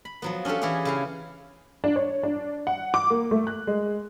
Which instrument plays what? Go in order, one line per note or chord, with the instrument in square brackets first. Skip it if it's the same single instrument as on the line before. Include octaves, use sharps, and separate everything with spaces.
[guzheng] B5
F3 F#3 B3
C#4 D4 F4 G4 A4
E3 E4 G4 G#4 C#5
C#3 E4 F5
[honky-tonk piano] D4
C#5
D4
F#5
D6
A#3
A3
F#6
G#3